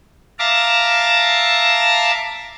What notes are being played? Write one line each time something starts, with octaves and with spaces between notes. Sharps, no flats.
E5 F5 A5 A#5 D6